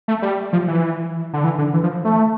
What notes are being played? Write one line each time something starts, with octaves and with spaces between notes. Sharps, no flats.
A3
G3
F3
E3
D3
E3
D3
E3
F3
A3